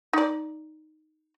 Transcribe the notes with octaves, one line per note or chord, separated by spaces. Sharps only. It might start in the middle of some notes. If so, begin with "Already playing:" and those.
D#4 D5